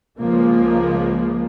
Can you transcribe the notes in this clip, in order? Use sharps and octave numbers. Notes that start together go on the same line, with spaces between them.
C#2 C#3 F3 G#3 A#3